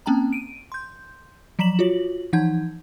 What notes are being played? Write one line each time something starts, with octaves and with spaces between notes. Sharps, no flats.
A#3 C4 C#4 G5 A5 A#5
D7 D#7
C6 G6
F3 F#3 A#5 B6 E7 F#7
F4 F#4 C#5 F#7
E3 F3 D#4 F#5 G6 G#6